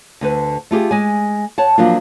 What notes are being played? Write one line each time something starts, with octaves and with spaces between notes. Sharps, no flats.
D2 D3 B4
A3 F4 G4 G#4
G#3 G#5
C#5 F#5 A5
F3 F#3 A#3 D4 F4